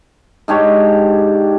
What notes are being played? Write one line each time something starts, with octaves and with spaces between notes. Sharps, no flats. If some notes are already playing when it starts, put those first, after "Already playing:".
G#2 D4 G4 C#5